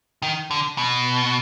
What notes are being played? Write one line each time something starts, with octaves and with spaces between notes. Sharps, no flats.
D#3
D3
B2